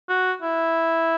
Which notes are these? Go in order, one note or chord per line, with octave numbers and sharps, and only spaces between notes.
F#4
E4